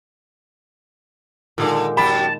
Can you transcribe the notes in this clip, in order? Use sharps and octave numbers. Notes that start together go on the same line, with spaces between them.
A#2 D3 D#3 G#3
F#2 G4 A5 B5